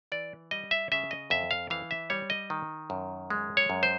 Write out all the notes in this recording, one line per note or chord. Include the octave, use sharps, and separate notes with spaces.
E3 D5
G3 D#5
E5
C#3 E5
D#5
F2 E5
F5
E3 F5
E5
G3 C#5
D#5
D#3
F#2
G#3
C#5
F#2
C5